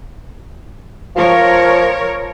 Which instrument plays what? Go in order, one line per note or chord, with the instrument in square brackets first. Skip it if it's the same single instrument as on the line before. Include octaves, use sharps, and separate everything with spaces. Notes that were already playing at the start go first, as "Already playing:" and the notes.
[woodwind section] F3 [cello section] A#4 C#5